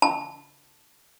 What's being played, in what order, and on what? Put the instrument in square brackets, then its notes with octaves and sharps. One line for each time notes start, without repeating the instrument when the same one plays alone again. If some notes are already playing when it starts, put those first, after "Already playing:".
[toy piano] A5